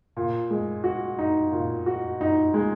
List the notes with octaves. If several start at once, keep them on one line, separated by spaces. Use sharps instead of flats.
A#2
G#3
F#4
D#4
A#2
F#4
D#4
G#3